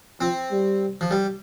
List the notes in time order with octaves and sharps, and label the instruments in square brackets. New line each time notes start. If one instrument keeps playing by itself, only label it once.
[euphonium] F3 [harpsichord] C4
[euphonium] G3
[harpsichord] F3
G3